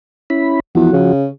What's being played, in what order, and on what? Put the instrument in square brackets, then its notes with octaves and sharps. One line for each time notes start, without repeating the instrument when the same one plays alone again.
[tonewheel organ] C#4 E4 B5
[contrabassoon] E2 [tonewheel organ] F3 F#4
[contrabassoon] C#3